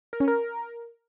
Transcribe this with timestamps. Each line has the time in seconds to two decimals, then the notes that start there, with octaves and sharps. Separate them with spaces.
0.13 A#4
0.20 C#4
0.28 A#4